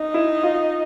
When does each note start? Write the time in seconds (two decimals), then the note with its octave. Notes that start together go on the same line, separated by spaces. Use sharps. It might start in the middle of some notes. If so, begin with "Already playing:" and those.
Already playing: D#4
0.14 E4
0.43 F4